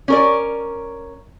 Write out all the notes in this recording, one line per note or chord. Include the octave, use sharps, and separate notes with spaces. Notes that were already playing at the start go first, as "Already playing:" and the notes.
C#4 A#4 D5